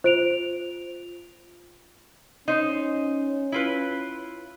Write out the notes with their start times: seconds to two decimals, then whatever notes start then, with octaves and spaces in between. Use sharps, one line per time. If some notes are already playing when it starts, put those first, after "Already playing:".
0.04 F4 C5 D7 F7
2.48 C#4 D#4 C5
3.52 E4 F4 B4